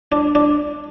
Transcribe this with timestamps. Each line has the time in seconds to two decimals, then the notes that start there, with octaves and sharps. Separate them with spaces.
0.12 D4
0.35 D4